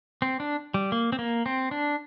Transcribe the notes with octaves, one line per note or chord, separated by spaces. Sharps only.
C4
D4
G3
A#3
C4
A#3
C4
D4